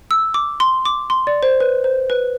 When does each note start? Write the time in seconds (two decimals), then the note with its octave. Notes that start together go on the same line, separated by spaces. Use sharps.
0.11 E6
0.34 D6
0.60 C6
0.85 D6
1.10 C6
1.27 D5
1.43 C5
1.60 B4
1.84 C5
2.10 B4